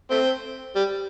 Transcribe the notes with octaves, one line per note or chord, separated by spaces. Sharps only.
A3 C4
G3